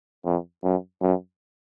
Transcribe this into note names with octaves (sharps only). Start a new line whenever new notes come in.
F2
F#2
F#2